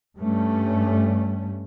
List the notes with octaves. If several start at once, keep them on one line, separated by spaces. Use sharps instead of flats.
G2 G3 A3 C#4